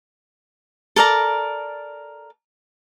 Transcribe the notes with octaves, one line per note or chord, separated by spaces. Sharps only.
A4 A#4 D5 A#5